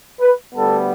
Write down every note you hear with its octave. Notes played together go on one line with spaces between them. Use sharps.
B4
D2 D3 G3 B3 A4